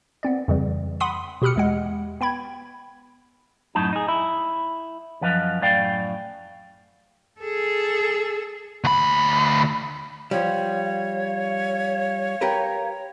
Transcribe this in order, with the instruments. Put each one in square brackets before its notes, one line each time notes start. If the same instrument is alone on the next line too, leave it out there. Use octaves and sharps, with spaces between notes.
[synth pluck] B3 C4 D5
F2 C#3 E3 G3
F#5 B5 C6 D#6 B6 D#7
B2 G4 B5 D#6 F6 C#7
E2 G#3 F#5
B3 G5 B5 G#6
[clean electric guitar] F#2 A2 D#4 A5
D#4 G#4
E4
F#2 F3 B4 D#5 F5
F#2 A2 D5 F5 G5
[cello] G#4 A4
[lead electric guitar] D2 B5
[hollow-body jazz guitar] F3 G3 [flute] C#5 [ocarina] F5
[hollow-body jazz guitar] G4 A#4 B4